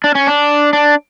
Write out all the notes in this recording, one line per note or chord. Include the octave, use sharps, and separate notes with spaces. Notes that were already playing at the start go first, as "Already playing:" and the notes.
D4
C#4
D4
D4